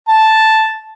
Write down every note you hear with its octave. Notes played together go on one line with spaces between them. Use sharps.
A5